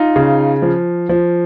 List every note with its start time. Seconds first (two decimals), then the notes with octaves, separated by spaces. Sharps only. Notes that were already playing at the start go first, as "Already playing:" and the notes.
Already playing: D#4 F4
0.16 C#3
0.62 F3
1.09 F3